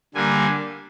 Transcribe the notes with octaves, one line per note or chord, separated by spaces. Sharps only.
D3 G3 A#3 D4 G#5